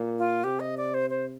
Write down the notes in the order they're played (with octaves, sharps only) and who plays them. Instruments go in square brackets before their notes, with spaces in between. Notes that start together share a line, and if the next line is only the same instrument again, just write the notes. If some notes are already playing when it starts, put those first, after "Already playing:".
Already playing: [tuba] A#2
[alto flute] F4
[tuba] C3 [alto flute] G4
[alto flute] D#5
D5
C5
C5